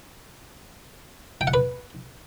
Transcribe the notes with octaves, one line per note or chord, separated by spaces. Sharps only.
G5
F#5
B4